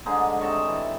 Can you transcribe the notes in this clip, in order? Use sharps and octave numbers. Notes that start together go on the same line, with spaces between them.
G#2 D3 D#4 G#4
C3 D#5 A5 C#6
E3